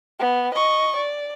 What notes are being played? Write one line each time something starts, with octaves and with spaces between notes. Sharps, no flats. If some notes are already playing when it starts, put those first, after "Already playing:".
B3
D#5 C#6
D5